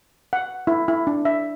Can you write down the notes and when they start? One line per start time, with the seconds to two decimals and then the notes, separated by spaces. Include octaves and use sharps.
0.33 F#5
0.67 E4
0.88 E4
1.07 D4
1.25 E5